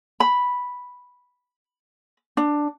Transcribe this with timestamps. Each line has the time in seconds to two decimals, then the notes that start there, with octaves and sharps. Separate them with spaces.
0.20 B5
2.37 D4